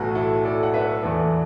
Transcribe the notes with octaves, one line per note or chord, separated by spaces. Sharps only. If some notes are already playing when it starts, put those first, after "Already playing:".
Already playing: B1 A2 E3 B3 F#4 A4
E4 A4
A4 D5
F#5
B4 E5
E2 E3 B3 A4 D5